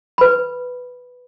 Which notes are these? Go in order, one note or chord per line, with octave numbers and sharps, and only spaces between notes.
B4 B5